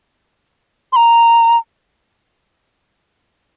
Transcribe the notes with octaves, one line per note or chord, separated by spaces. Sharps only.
C6
A#5